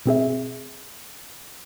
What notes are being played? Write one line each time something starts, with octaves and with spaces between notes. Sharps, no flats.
B2 C4 G#4 E5